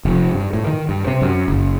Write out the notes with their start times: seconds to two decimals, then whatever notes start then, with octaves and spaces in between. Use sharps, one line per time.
0.05 F1
0.31 G2
0.53 A2
0.67 D#3
0.89 G2
1.07 C3
1.22 F#2
1.48 F#1